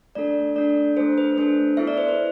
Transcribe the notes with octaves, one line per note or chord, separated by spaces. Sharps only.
A3 D4 A4 D5
A3 D4 A4 D5
A3 D4 A4 C5
B4
A3 D4 A4 C5
B3 E4 A4 E5
D5
C5
B4